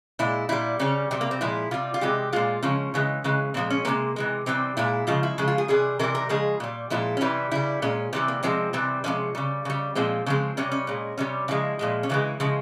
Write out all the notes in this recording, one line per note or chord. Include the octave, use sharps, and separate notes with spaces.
A#2 G#3 E4
A#2 G3 E4
C#3 G3 C#4
C3 G3 C4
A#3
C4
A#2 F3 G#3 E4
C3 G3 F4
F4
C3 E3 G#3 G4
A#2 G#3 F4
C#3 F3 G#3 C#4
C#3 E3 G#3
C#3 E3 G#3
A#2 F3 G#3 C4
C#4
C3 F3 G#3 A#3
C3 E3 G#3
C3 E3 G3 C4
A#2 G#3 E4
C#3 F3 G#3 F4
E4
C#3 F3 G#3
F4
G#4
C3 E3 G3 G#4
C3 E3 G3 A#4
A#4
C#3 F3 G#3 G#4
A#2 G3
A#2 F3 G#3 E4
C#4
C3 E3 G3 E4
C#3 G3 E4
A#2 G#3 C#4
C3 E3 G3 C4
A#3
C3 F3 G#3 C4
C3 E3 G3 C4
C3 F3 G#3 C#4
C#3 G3
C#3 G3
A#2 F3 G#3 C4
C#3 F3 G#3 C4
C3 G3 C#4
C#4
A#2 G#3
C3 G3 C#4
C#3 F3 G#3 E4
A#2 F3 G#3
C#4
C#3 E3 G#3 E4
C#3 F3 G#3